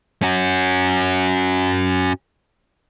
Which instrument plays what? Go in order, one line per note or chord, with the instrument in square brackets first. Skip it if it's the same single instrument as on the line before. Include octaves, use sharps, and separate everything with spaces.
[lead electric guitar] C#4 F#4